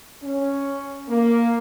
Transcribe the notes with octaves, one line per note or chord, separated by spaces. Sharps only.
C#4
A#3